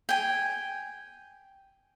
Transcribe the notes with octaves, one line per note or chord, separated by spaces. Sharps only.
G5 G#5